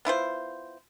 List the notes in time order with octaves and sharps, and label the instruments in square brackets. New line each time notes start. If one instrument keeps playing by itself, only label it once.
[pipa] B3 E4 F4 C5